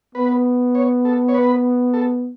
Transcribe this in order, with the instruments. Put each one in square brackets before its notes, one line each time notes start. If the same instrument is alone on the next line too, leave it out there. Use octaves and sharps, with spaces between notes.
[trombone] B3 [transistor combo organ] B4
[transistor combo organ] C#5
A4
C#5
B4
A4